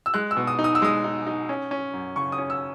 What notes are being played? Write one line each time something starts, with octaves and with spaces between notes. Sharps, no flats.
E6
G#3 F#6
E6
B2
D#6
D#4
D#6
E6
G#3 D#6
D#4
D#4
C#4
C#4
F#2
C#3 C#6
D#6
C#4
E6